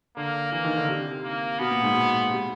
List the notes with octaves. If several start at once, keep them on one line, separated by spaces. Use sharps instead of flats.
D3 A#3
E3 A#3
D#3
D3
C3
A#3
B2 B3
A#2
G#2
B2
C3